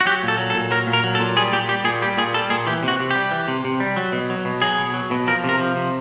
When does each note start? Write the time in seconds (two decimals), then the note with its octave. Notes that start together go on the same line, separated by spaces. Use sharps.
0.01 F#4
0.06 F#3 G4
0.23 A#2
0.28 A4
0.38 F#3
0.50 A4
0.54 A#2
0.71 F#3 A#4
0.87 A#2
0.93 A#4
1.04 F#3
1.15 A4
1.20 A#2
1.36 G3 G#4
1.53 A#2 G4
1.68 G3 G4
1.84 A#2 G#4
2.02 G3 G4
2.17 A#2 G#4
2.34 G3 A4
2.50 A#2 G#4
2.67 E3 G4
2.83 C3
2.88 F#4
3.00 C3
3.11 G3 G4
3.31 E3
3.48 C3
3.64 C3
3.80 G3
3.96 F#3
4.12 B2
4.30 F#3
4.45 B2
4.62 F#3 G#4
4.78 B2
4.94 F#3
5.11 B2
5.27 F3 A#4
5.44 C3 A#4
5.59 F3
5.75 C3